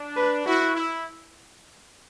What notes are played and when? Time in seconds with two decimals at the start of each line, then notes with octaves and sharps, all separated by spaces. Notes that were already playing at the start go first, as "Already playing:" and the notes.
Already playing: D4
0.16 B4
0.45 E4 F#4
0.75 E4